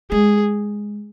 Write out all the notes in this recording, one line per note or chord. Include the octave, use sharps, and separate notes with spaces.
G#3 G#4